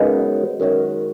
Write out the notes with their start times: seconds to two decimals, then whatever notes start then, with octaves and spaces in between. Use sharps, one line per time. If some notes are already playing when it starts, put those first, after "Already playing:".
Already playing: F#2 C#3 G#3 B3 D#4
0.60 F#2 D#3 G#3 C#4 F#4